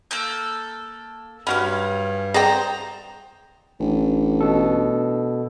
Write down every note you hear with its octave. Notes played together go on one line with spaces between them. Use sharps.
A#3 A4 G6
G2 F#3 C#4 F5 B5
G#4 C5 D5 G5 A#5
A1 D4
B2 A4